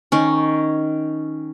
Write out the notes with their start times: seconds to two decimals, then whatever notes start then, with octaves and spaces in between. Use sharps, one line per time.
0.12 D#3 C#4